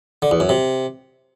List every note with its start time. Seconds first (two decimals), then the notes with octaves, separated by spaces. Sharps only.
0.22 D3
0.31 E2
0.40 F#2
0.49 C3